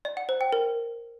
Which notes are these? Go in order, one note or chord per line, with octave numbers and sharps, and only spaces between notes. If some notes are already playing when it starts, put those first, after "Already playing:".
D5
F#5
C5
G5
A#4